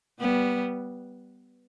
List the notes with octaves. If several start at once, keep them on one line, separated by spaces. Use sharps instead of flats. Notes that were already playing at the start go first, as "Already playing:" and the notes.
G3 B3